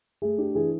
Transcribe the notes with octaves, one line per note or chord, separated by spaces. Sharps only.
A3 G#4
D4 G4
E3 G#4